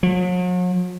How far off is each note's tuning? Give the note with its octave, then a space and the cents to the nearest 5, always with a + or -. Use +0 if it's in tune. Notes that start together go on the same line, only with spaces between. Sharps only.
F#3 -45